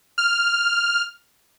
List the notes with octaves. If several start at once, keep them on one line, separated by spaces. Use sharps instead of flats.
F6